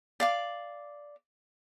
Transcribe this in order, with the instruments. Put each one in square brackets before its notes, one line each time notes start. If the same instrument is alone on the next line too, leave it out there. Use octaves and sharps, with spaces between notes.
[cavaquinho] D5 F5 D6